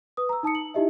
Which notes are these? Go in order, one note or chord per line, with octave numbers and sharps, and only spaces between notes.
B4 D#6
A#5 E6
D#4 A5 D#6 C#7
F#7
D#4 E4 G4 D#5 E5